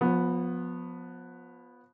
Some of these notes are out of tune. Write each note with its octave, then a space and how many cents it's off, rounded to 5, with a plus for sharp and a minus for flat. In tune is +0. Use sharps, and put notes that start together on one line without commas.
F3 +25 B3 -5